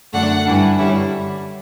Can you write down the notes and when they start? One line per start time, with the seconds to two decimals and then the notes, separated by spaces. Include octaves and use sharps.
0.13 F#2 D3 A3 D4 F#5
0.45 G2 E3 G3 D4
0.78 G2 D3 G3 C#4 E4